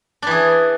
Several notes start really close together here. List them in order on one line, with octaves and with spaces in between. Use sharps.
D4 E3 G#4